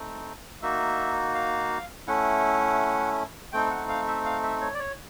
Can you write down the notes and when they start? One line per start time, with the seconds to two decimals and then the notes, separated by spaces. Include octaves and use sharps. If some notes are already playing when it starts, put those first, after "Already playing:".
Already playing: A3 C4 D#4
0.62 A#3 D#4 F#4 E5
1.35 F5
2.07 A3 C#4 E4 F#5
3.53 A3 C4 D#4 G5
3.70 F#5
3.89 F5
4.07 E5
4.25 F5
4.43 E5
4.61 C#5
4.74 D5
4.79 C#5